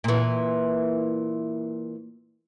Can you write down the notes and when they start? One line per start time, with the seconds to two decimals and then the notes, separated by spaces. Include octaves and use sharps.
0.04 A#2 E3